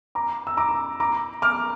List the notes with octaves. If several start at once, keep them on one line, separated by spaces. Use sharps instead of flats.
A#5 D6
E6
A#5 D6
A#5 D6
D6 F6